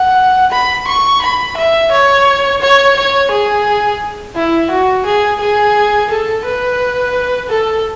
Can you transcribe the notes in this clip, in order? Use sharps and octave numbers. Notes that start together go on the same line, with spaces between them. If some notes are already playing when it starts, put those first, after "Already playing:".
Already playing: F#5
B5
C#6
B5
E5
C#5
C#5
C#5
G#4
E4
F#4
G#4
G#4
A4
B4
A4